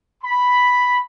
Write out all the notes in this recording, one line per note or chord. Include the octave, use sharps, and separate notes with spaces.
B5